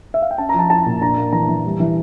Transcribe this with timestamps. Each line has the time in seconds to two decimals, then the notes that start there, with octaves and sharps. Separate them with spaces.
0.14 E5
0.22 F5
0.31 G5
0.38 C#4 A5
0.49 F3 A#5
0.59 A5
0.70 E4 A5
0.86 A#2
1.01 D4 A#5
1.17 A#3
1.33 E3 A#5
1.49 E3
1.64 G3
1.80 E3